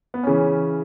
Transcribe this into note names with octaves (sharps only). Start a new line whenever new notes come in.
B3
C#3 E3 C#4